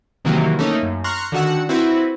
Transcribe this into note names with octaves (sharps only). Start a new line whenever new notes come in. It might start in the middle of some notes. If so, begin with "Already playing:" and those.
C3 D#3 E3 F#3 A#3
A3 A#3 C#4 D#4
F#2
A#5 C6 C#6 F6 F#6 A#6
D3 D#3 F#4 F#5 E6
C4 E4 F#4 B4